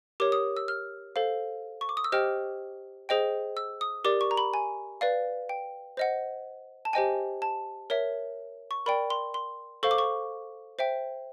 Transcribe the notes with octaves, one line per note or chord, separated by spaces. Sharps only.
G4 A#4 C#5 D6
D#6
E6
F6
A4 C5 F5
C#6
D6
D#6
E6
G4 C5 D#5 G5 F6
G#4 C5 D#5 G5
E6
D#6
G4 A#4 D5 D6
C#6
A#5
B5
G#5
B4 D5 F5
G5
C5 D#5 F#5
A5
G4 C5 D#5 G5 G#5
A5
A#4 C#5 E5
C#6
A#4 D5 G5 B5
C6
C6
A4 C5 F5 C#6
D6
C#6
C5 E5 G5